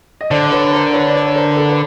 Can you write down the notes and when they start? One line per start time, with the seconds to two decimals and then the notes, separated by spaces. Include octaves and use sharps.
0.21 D#5
0.31 D3 C5 D5
0.51 B4 C#5
0.73 A#4 C5
0.93 B4 C#5
1.07 D5
1.14 B4 C#5
1.27 C#5
1.35 A#4 C5
1.56 A4 B4
1.69 B4